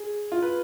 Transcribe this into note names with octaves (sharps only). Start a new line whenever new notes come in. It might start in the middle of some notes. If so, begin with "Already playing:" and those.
Already playing: G#4
F4
B4